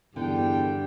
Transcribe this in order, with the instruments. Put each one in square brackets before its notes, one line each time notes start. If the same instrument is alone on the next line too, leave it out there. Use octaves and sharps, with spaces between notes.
[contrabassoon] E2 [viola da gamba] G2 [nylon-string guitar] D3 [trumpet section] G5